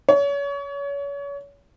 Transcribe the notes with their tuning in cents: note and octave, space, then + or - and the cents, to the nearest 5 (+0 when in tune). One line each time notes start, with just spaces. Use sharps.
C#5 +30